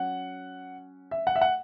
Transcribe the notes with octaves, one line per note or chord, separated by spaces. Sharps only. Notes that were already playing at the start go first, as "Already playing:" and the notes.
Already playing: F#3 C#4 F#5
E5
F#5
E5
F#5